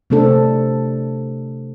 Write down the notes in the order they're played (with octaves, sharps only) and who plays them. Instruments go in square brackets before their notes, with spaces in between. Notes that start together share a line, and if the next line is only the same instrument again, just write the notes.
[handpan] C3 A3 C4 D4 A4